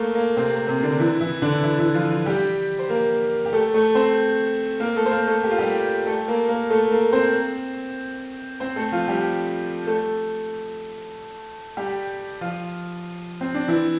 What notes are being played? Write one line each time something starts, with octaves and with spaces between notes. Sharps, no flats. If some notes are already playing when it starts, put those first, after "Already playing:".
Already playing: A3 A#3
A#3
C3 C4
A#3
C3 C4
D3 D4
E3 E4
E3 E4
D3 D4
E3 E4
E3 E4
F3 F4
F3 F4
G3 G4
C5
A#3 A#4
G4
A3 A4
A3 A4
C4 C5
A#3 A#4
A3 A4
C5
A#3 A#4
A3 A4
G4
F4
G3 G4
A3 A4
A#3 A#4
A#3 A#4
A3 A4
A#3 A#4
C4 C5
C4 C5
A3 A4
F3 F4
G3 G4
A3 A4
G3 G4
F3 F4
C4
D4
E3 E4